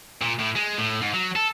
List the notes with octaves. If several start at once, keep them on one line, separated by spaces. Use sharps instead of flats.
A#2
A2
G#3
A2
G#2
F#3
A4